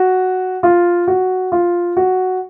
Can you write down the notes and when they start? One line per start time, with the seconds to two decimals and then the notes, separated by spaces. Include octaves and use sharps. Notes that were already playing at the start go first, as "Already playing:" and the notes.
Already playing: F#4
0.63 F4
1.08 F#4
1.52 F4
1.97 F#4